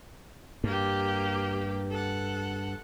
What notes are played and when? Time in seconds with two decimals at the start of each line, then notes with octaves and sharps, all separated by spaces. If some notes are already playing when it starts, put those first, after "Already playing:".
0.64 G2 A#3 G4
1.91 A4 F#5